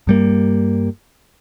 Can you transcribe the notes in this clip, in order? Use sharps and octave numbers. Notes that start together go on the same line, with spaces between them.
G2 G3 A#3